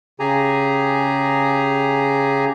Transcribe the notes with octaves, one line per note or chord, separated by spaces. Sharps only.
C#3 G4 G#4 G#5 A#5